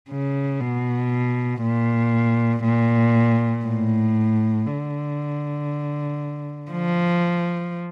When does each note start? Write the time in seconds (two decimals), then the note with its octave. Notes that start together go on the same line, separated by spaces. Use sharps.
0.10 C#3
0.60 B2
1.62 A#2
2.63 A#2
3.65 A2
4.67 D3
6.70 F3